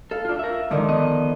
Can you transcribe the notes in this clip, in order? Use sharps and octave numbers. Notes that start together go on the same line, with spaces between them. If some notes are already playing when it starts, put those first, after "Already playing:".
A4 F5
D4 F4
A#4 E5
G#2 D3 D#3 F3
B3 D#5